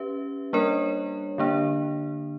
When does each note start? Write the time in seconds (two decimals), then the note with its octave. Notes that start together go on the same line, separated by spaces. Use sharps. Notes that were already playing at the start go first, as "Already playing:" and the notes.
Already playing: C#4 G4 B4 E5
0.53 G3 A#3 D4 A#4 C#5
1.38 D3 A#3 D4